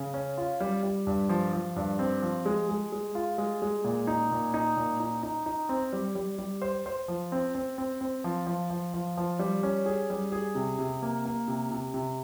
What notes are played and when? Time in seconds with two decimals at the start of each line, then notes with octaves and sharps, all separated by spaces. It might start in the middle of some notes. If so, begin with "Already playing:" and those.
Already playing: C#3
0.14 C#4
0.38 F4
0.60 G3
0.83 G3
1.07 G2
1.29 F3
1.53 F3
1.76 G2
1.99 C4
2.22 F3
2.46 G#3
2.69 G#3
2.92 G#3
3.15 F4
3.38 G#3
3.62 G#3
3.84 A#2
4.07 D#4
4.31 A#2
4.54 D#4
4.77 A#2
5.00 D#4
5.23 D#4
5.46 D#4
5.69 C4
5.93 G3
6.15 G3
6.38 G3
6.62 C5
6.86 C5
7.08 F3
7.32 C4
7.55 C4
7.78 C4
8.01 C4
8.24 F3
8.47 F3
8.70 F3
8.94 F3
9.17 F3
9.39 G3
9.63 C#4
9.86 G#4
10.10 G3
10.32 G#4
10.55 C3
10.79 C3
11.03 A#3
11.25 A#3
11.48 C3
11.71 C3
11.94 C3